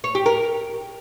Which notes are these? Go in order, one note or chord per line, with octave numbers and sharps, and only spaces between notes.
C#5
G4
A#4